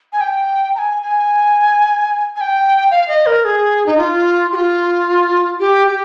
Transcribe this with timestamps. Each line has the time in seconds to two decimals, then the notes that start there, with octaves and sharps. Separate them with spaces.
0.13 G#5
0.21 G5
0.75 A#5
0.79 G#5
1.02 G#5
2.36 G#5
2.41 G5
2.91 F5
3.08 D#5
3.26 A#4
3.45 G#4
3.86 D#4
3.98 F4
4.52 G4
4.55 F4
5.60 G4
5.87 G4